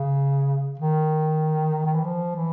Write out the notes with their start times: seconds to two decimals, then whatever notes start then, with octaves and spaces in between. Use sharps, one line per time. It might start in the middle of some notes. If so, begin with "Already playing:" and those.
Already playing: C#3
0.79 D#3
1.86 D#3
1.95 E3
2.04 F3
2.36 E3